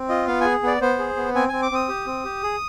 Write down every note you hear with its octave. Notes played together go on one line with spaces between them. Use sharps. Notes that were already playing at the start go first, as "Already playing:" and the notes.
Already playing: C4
F4 D#5
B3 F5
G#4 G#5
B3 D5
B3 C5
G#4
B3
C4 G#5
C4 G#5
D6
C4 D#6
G4
C4
G4
G#4